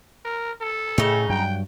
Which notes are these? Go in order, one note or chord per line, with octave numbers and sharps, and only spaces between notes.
A#4
A4
A2 C#3 D#4
G2 F#3 G5